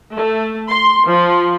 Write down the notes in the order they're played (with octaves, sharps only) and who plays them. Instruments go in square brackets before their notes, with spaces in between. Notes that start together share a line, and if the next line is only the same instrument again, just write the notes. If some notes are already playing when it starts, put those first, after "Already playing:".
[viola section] A3
C6
F3